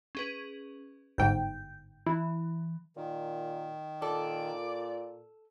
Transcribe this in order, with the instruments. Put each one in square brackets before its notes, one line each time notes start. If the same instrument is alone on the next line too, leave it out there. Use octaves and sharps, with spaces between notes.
[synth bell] C#4 G#4 B4
[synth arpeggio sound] G1 G#2 G5 [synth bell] G6
[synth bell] E3 [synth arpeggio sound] E4
[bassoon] A#2 [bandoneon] D#3
[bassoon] A#2 [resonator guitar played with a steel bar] A4 [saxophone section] D5